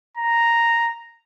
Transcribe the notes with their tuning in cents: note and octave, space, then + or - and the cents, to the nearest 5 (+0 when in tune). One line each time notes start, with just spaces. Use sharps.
A#5 -5